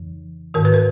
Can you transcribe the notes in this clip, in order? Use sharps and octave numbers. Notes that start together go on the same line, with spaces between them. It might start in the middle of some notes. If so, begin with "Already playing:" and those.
Already playing: F2 C#3 E3
G#2 D#3 A#4
B4
A#4